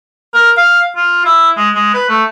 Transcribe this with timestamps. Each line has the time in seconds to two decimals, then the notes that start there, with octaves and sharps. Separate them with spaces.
0.34 A#4
0.57 F5
0.96 F4
1.25 E4
1.57 G#3
1.75 G#3
1.94 B4
2.09 A3